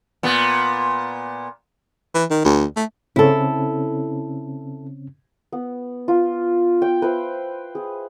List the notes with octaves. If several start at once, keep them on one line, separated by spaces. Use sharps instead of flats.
A#2 B3
E3
D#3
D2
A3
C#3 C4 C#4 E4 A4
B3
F4
G5
B4 C5 E5
G#4